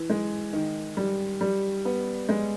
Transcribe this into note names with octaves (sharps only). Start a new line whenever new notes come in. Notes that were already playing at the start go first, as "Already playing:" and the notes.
Already playing: E3
G#3
D#3
G3
G3
B3
G#3